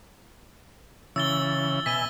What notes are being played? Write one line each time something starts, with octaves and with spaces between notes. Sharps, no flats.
C#3 E3 E6 A6 G7
B2 E5 G#5 B6 D#7 G7